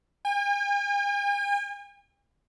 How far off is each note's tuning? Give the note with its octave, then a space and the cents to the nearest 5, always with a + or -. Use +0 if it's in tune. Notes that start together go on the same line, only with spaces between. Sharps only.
G#5 -45